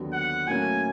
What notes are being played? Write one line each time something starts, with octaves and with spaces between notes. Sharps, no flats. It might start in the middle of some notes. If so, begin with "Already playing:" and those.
Already playing: D#2 D3 F#3 B3
F#5
A2 F#3 A#3 C#4 G#5